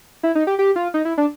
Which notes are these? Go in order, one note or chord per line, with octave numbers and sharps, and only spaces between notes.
E4
D#4
G4
G4
F4
D#4
E4
D4